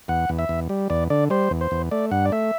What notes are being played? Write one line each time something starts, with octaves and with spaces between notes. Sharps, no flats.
E2 F#5
E2
E5
E2
G3
E2 D5
D3 D5
G3 C5
E2
C5
E2
A3 D5
G2 F#5
D5
A3 E5